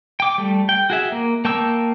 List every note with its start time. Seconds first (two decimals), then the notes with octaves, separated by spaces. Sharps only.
0.20 G5 D6
0.38 G3 A3
0.69 G5
0.90 F#4 G#4 E5
1.12 A#3
1.45 A#3 G5 A5 C#6 E6